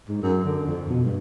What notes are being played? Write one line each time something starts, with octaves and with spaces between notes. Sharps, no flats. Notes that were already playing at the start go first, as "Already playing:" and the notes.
G#2
F#2
D3
F2
B2
G2